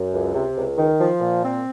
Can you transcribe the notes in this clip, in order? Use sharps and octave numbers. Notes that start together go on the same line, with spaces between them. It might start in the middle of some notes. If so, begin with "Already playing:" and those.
Already playing: F#2
C#2
C3
C#2
D#3
F3
A#2
C4